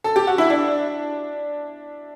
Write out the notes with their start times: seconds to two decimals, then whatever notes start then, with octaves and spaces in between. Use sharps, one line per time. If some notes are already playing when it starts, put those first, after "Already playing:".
0.04 A4
0.16 G4
0.27 F#4
0.38 E4
0.50 D4